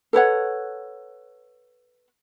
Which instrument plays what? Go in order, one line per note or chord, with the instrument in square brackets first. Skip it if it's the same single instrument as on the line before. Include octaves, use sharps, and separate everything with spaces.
[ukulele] A4 B4 C#5 F#5